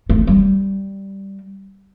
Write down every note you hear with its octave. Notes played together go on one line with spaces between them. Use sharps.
A3
G3